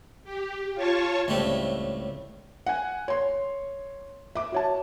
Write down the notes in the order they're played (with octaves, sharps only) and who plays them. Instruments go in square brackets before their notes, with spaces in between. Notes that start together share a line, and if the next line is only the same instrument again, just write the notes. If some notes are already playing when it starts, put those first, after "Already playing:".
[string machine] G4
F4 C#5 A5 C#6
[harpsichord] C#2 A2 G3 A3 C4
[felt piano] F#5 G#5
C#5 C6
E5 D6
F#4 C#5 A5